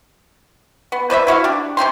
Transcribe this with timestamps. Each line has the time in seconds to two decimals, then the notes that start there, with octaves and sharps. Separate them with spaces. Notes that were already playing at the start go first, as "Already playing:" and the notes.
0.92 B3
1.10 B4 C5 D5 E5
1.27 E4 F#4 E5 F5
1.44 D4 G4
1.77 C3 D#4 G5 C6